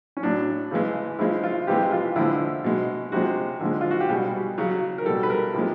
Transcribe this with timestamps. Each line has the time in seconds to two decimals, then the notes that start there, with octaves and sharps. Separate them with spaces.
0.17 C#4
0.23 A2 F#3 D4
0.71 C#3 E3 G#3
1.19 C#3 F3 G#3 E4
1.44 F4
1.67 C3 E3 G#3 G4
1.92 F4
2.16 D3 F3 G#3 E4
2.64 B2 G#3
3.12 C3 F3 G#3 F#4
3.61 D3 F3 G#3
3.81 F4
3.91 F#4
4.01 G4
4.09 B2 G3 G#4
4.58 C#3 F#3
4.98 A#4
5.06 B2 G3 A4
5.23 B4
5.30 A#4
5.55 C3 F3 G#3